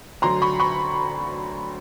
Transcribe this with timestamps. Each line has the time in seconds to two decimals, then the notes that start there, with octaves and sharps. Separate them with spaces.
0.22 D2 D3 F#3 A#5 C6
0.42 B5 C#6
0.60 B5 C#6